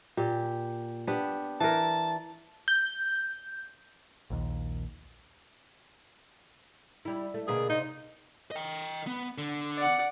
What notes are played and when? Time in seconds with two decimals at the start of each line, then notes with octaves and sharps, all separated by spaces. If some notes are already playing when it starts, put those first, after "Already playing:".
0.17 A#2 G4
1.07 B3 D4 G4
1.60 E3 A#4 A5
2.68 G6
4.30 A#1 D#2
7.05 G3 E4
7.34 A3
7.48 D2 B2 A#3 G#4
7.70 C3 D#4
8.51 D#5 G5
9.07 B3
9.38 D3
9.77 D5 F#5